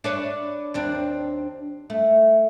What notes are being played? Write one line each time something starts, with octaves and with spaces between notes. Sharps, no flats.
D4 B4 C#5
D#2 C4 D4
A3